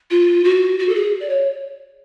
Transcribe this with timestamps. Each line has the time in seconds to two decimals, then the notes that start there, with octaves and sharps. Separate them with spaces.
0.10 F4
0.44 F#4
0.79 F#4
0.89 A4
0.95 G#4
1.20 D5
1.29 C#5